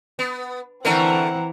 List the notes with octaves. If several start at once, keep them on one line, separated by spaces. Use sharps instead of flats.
B3
D3 E3 A3 C4 A#4 F#5 A#5